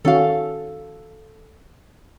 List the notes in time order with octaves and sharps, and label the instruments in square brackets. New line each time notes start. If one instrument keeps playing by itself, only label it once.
[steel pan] D#3 C#4 F#4 [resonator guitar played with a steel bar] A4 F5